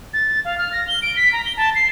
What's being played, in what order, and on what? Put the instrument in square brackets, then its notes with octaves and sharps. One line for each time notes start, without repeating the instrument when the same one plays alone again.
[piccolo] A6
F5
F6
A#6
G7
D7
B6
A#5
G7
A5
C7